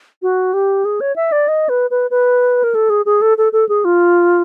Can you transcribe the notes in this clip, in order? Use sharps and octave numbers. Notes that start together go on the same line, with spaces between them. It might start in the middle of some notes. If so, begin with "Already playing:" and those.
F#4
G4
G#4
C#5
E5
D5
D#5
B4
B4
B4
A#4
A4
G#4
G#4
A4
A4
A4
G#4
F4